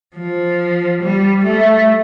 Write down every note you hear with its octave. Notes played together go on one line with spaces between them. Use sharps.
F3
G3
A3